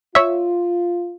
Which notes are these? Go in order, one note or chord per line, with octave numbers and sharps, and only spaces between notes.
F4 C#5 E5